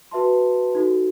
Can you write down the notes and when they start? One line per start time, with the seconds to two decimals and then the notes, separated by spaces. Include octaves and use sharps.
0.11 F#4 B4 E5 A5 C6
0.75 D#4 F#4 A4